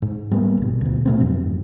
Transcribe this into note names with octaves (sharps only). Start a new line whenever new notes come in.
G#2
G3 A#3 B3
G1 B2
D2 B2
B2 A3 C4
G1 F2 G#2 F#3